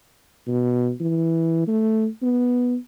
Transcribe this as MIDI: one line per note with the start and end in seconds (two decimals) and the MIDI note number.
0.47 0.92 47
1.01 1.67 52
1.68 2.08 57
2.22 2.77 59